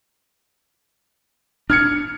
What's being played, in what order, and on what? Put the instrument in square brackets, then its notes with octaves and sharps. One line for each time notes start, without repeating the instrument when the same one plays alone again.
[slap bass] D4 [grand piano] F6 G#6 C#7